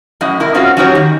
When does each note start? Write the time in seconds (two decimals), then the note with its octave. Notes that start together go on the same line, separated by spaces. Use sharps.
0.21 F#2 A2 D#5
0.40 C3 E4 A#4
0.54 G#3 C4 C#4 F4 F#4
0.77 F#3 C#4 D#4 F#4 G4 C#5
0.95 D#3